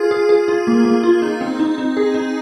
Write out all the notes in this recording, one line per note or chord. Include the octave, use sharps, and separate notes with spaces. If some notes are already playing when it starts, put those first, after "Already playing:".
Already playing: F4 G#4
G#4
G#4
F4
A#3
A#3
F4
D#4
C4
D#4
D#4
G#4
D#4